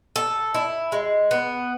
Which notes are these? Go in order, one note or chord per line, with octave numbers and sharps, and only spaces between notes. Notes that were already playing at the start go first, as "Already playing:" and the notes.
A4
E4
G#3
B3